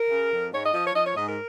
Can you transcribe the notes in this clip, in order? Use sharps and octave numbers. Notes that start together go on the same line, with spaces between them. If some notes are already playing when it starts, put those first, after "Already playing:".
Already playing: A#4
C#3
F2
G#2 C#5
D#5
F3 D#5
C#5
F3 D#5
C#5
G#2 D#5
A#4